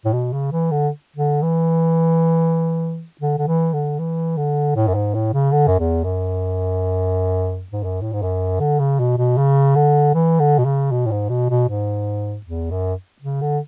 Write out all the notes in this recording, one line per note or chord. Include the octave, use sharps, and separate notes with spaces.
A2
B2
C#3
E3
D3
D3
E3
D3
D3
E3
D3
E3
D3
A2
F#2
G#2
A2
C#3
D3
F#2
E2
F#2
G#2
F#2
A2
G#2
F#2
D3
C#3
B2
B2
C#3
D3
E3
D3
B2
C#3
B2
A2
G#2
B2
B2
G#2
E2
F#2
C#3
D3